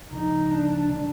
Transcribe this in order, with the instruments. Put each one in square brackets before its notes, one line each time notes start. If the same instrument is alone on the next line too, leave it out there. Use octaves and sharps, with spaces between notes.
[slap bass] D2 C#3 F3 A#3 [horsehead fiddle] D#4
[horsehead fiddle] D4
[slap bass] C#3 E3 G3